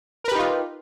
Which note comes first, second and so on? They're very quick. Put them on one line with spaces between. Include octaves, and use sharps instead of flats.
A#4 B4 G4 D#4 F4